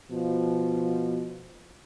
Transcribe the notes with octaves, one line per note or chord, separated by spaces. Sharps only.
B2 F3